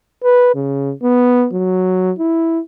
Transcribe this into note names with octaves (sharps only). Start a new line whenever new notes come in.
B4
C#3
B3
F#3
E4